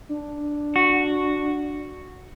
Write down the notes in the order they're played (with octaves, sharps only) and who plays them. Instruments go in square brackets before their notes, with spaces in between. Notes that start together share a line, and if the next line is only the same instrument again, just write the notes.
[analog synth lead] D4
[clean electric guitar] F#4